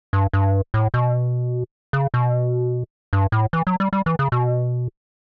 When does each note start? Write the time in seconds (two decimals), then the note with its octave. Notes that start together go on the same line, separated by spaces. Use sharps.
0.13 G2
0.33 G2
0.74 A2
0.94 B2
1.93 C#3
2.14 B2
3.13 G2
3.32 A2
3.53 E3
3.67 F#3
3.80 G3
3.93 G3
4.06 E3
4.19 C#3
4.32 B2